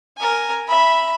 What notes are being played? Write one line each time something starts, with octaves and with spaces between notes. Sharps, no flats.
A#4 G#5
E5 B5